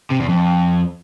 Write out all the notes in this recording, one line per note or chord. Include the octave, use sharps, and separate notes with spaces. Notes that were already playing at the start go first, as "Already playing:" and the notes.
C3
E2
F2